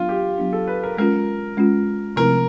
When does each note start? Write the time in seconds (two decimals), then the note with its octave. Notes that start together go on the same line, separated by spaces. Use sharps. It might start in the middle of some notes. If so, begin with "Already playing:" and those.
Already playing: F#3 B3 D4 F4
0.09 G4
0.38 F#3 B3 D4
0.53 A4
0.68 B4
0.83 A#4
0.98 G#3 C#4 F4 A#4
1.57 G#3 C#4 F4
2.16 C3 F3 A3 C4 E4 A#4